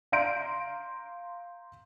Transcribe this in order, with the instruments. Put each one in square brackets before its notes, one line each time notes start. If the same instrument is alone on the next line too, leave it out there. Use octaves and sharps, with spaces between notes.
[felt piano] F5 A#5 C6 G6 D7